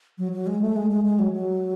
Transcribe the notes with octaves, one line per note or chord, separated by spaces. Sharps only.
F#3
F#3
G#3
A3
G#3
G#3
G#3
F#3
F#3